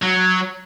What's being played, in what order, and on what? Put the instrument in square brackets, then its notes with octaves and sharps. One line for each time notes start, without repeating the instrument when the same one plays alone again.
[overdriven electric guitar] F#3